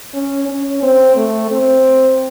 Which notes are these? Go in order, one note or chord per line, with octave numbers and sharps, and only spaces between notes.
C#4
C#4
C4
A3
C4